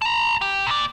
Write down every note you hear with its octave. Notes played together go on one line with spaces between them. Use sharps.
A5 A#5
G4
A#2 D5